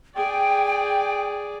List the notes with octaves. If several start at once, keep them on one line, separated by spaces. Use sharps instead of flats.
G#4 D5 G5